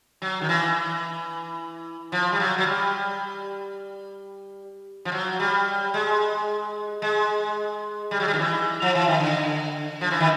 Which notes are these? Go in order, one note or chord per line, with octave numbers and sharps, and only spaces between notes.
F#3
D#3
E3
F3
G3
F#3
F#3
G3
F3
F#3
G3
G#3
G#3
G3
F#3
G3
D#3
E3
F3
E3
D#3
D3
F3
E3
D#3